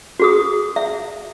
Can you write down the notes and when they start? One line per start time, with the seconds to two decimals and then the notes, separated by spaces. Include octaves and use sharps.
0.19 F#4 G#4 D#6
0.76 E5